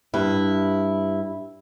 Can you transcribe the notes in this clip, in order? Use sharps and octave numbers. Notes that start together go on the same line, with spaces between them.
G2 E4